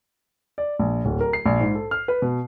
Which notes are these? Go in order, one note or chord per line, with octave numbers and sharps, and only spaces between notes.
D5
A#1
D1
A#4
C7
A#1
G#2
A4
F6
B4
B2